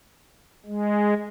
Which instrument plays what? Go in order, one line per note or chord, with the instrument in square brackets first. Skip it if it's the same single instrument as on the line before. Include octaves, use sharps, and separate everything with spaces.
[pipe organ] G#3